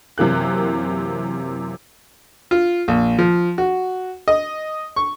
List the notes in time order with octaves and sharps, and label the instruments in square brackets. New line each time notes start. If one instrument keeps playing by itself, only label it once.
[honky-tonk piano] F#2 C3 E3 A#3 F#6
[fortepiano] F4
A#1
F3
F#4
D#5
C#6